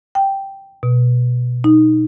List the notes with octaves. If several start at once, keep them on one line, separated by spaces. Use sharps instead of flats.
G5
B2
D#4